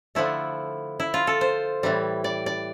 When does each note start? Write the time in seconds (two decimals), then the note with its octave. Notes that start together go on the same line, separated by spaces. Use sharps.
0.15 D3 F3 A3 E4
1.00 E4
1.14 F4
1.27 A4
1.41 C5
1.83 A2 E3 G3
2.24 D5
2.46 D5